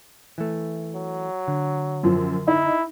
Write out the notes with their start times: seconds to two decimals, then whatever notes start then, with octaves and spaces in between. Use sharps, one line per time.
0.38 E3 A3
0.95 F#3
1.48 D3
2.03 F#2 F3
2.48 D#4 E4